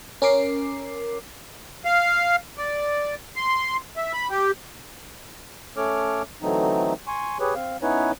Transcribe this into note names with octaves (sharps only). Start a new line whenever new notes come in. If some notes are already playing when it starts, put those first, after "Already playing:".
C#4 A#4 D6 C7
F5
D5
C6
E5
B5
G4
A3 C#4 A4 C#5 D6 F6
D3 E3 F#3 A3 C4 D#4
G#5 C6 C#6
G4 G#4 B4 C#5
C4 F5
B3 C#4 D#4 E4 B4 C#5